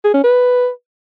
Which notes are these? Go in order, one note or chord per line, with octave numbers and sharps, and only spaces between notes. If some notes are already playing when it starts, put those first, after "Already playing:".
G#4
C#4
B4